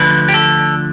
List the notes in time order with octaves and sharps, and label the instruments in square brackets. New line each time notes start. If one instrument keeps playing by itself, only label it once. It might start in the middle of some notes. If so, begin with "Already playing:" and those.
Already playing: [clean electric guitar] D2 D3 F3 B4
G4
A4